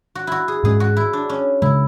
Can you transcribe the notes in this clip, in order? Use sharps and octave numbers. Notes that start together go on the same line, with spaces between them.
F#4
E4 F#4
G#4
G#2 G#3 C#4 G#4
F#4
E4
D4
C#4
C#3 G#3 E4